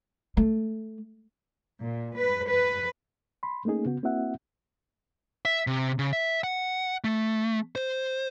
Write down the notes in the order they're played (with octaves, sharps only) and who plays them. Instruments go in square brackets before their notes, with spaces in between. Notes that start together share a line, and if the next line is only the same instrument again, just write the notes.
[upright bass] A3
[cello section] A#2
B4
B4
[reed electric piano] B5 C6
A3 A#3 C#4 D#4 G#4
C#3 B3 F#4
A#3 C4 E4 F#4 E5 F#5
[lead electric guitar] E5
C3
C#3
E5
F#5
A3
C5